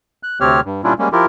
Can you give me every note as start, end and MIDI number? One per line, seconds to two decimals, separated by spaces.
0.23 0.39 90
0.41 0.60 38
0.41 0.60 48
0.41 0.60 60
0.41 0.60 67
0.41 0.60 73
0.41 0.60 89
0.65 0.81 43
0.84 0.93 46
0.84 0.93 55
0.84 0.93 61
0.84 0.93 62
0.84 0.93 64
0.84 0.93 65
0.99 1.09 55
0.99 1.09 56
0.99 1.09 58
0.99 1.09 61
1.13 1.26 53
1.13 1.26 64
1.13 1.26 65
1.13 1.26 67
1.13 1.26 70